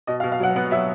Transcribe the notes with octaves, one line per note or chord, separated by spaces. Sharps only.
B2 D#5
F5
B2
F5
F#3 F#5
B3 F#5
F#3 E5